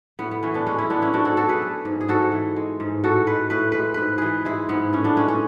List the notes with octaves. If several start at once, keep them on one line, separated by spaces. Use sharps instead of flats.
A2 B3
B3
E3 C#4
B3 D4
G#3 C#4
C#4 E4
A2 B3 D4
C#4 E4
G#2 D4 F#4
F#4 A4
F#3 F#4 A4
G#4 B4
A3
G#2
G#4
G#2 F#4 A4
E3
G#3
G#2
A2 F#4 A4
G#3 B4
A2 B4
G#3 B4
G#2 B4
E3 G#4 B4
G#3 E4 G#4
G#2 B3
A2 C#4
B3 D4
G#3 C#4
C#4